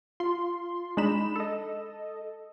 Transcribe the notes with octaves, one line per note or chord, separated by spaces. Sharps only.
F4 C6
G#3 D4 D#4 B5 E7
A4 D#5